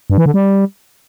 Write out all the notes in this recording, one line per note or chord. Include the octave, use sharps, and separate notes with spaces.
G2
E3
D3
G3